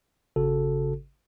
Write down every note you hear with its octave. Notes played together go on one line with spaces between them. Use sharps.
G#1 C#3 F#4 A4